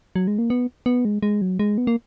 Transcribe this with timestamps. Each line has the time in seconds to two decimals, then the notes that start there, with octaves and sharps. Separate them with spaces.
0.16 F#3
0.27 G#3
0.38 A#3
0.50 B3
0.86 B3
1.05 G#3
1.23 G#3
1.42 F#3
1.59 G#3
1.78 B3
1.87 A#3